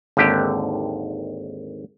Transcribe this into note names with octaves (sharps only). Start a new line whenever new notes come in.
G#1 D#2 D3 G4